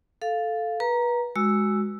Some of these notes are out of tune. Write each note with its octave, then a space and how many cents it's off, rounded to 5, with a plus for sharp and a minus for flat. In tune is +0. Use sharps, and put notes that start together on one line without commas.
A4 -5 F5 +0
B4 -30 A#5 +5
G#3 +0 F#4 +0 E6 +0